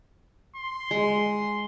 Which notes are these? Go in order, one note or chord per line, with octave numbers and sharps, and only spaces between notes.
C6
G#3